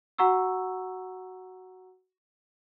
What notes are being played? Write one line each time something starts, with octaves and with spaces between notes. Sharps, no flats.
F#4 F#5 A#5 C#6 E6